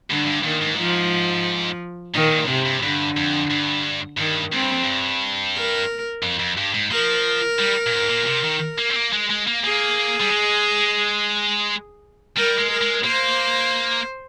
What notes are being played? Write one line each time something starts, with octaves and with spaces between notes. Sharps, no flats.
G2 D3
G2
A#2 D#3
G#2
F3
A#2 D#3
A#2
G#2 C3
G2
G2 D3
F2
G2
G2 D#3
G#2 C4
G2
F2
G2
A#4
F2
F2
G2
G#2
F3 A#4
G3
A#2
G#2
A#2
C3
D#3
A#3
C4
A#3
G#3
G#3
A#3
A#3 G#4
G3
G#3
G3 A#4
G#3
A#4
G#3
A#3 C5